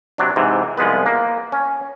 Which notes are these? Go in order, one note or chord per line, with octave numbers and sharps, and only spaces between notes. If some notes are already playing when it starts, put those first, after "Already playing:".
C3 F#3 D4
G#2 C3 E3
C2 F3 G#3 B3 B4
A#3
C#4